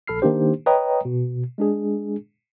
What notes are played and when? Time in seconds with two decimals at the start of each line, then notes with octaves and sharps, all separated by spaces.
0.07 A#1 A4 B5 F6 C7
0.22 D#3 A#3 D4 D#4 G4 C5
0.66 B4 C#5 D#5 G5 A#5 D#6
1.05 B2
1.58 G#3 D4 G#4